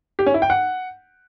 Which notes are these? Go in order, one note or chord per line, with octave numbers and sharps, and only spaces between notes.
G4
C#4
E4
G5
F#5